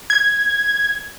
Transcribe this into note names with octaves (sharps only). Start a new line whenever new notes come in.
G#6